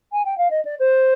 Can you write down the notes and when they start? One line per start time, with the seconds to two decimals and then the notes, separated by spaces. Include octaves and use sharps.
0.12 G#5
0.25 G5
0.37 F5
0.50 D#5
0.65 D5
0.79 C5